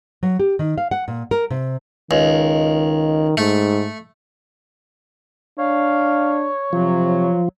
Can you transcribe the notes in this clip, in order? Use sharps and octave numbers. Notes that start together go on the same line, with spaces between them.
F#3
G4
D#3
F5
F#5
A#2
A#4
C3
C#2 D#3
G#2 A3
D4 C#5 F5
C3 F3 F#3